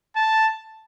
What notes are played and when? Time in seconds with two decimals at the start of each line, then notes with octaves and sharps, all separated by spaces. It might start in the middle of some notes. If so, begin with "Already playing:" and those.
0.16 A5